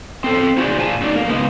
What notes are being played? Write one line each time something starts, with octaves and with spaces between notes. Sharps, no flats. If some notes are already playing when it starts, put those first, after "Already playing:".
C4 A4 C5
D#4 F4 F#4 G#4 C5 D5
A#2 F4 G#5 A5
F#2 F#3 D#4 D5
F2 A#3 A#4
C#3 G#3 A#3 B3 D#4